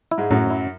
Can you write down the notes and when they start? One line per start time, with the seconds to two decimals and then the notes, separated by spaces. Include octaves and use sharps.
0.11 E4
0.18 G#2 G#3
0.31 F#2 A2 F#3
0.50 E4